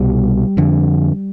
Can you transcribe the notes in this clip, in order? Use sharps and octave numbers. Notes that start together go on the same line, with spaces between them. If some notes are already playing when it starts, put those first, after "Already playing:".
Already playing: C2 B2 G3
F2 D3